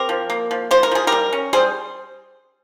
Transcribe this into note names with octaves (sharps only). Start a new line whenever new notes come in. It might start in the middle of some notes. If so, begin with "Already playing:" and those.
Already playing: C4 G4 A#4
F3
A#3
F3
F3 C5
A#4
F3 G#4
G3 G4 A#4
C#4
G3 G#4 C5